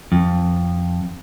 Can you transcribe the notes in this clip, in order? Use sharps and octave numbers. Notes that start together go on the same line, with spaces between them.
F2